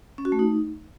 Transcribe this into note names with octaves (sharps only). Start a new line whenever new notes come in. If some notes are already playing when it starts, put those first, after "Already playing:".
C#4
F#4
A3
D#4